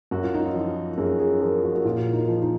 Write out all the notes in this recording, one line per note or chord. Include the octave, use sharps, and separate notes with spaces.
F#2 F#4
F4
D#4
F4
F3
F#2 G#4
G#4
F3 A#4
F#4
F#4
A#2 F4
D#4
F3
D#4